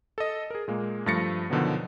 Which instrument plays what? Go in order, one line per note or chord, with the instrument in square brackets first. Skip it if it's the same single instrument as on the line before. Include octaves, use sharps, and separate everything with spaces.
[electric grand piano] A4 D#5
G#4 A#4
A#2 G#3 A#3
G2 F3 A3 A6 A#6 C#7
B2 D3 D#3 F3 F#3 B3